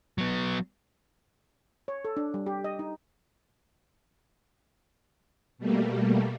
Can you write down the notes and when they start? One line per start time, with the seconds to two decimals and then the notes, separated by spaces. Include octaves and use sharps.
0.18 F#3 B3
1.88 C#5
2.05 A4
2.17 D4
2.34 G3
2.46 G4
2.64 D#5
2.79 D#4
5.58 B2 G3 A3 A#3